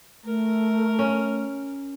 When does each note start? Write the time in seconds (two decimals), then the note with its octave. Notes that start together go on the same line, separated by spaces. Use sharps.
0.24 A3 A#4
0.99 C#4